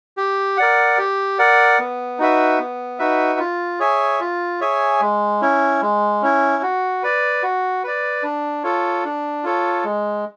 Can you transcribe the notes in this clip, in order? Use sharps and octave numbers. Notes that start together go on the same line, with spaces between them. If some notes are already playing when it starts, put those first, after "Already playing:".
G4
A#4 D5 F#5
G4
A#4 D5 F#5
B3
D#4 F#4 B4 E5
B3
D#4 F#4 B4 E5
F4
G#4 C#5 E5 G#5
F4
G#4 C#5 E5 G#5
G#3
C#4 E4
G#3
C#4 E4
F#4
B4 D5
F#4
B4 D5
D4
F4 A4 C#5
D4
F4 A4 C#5
G#3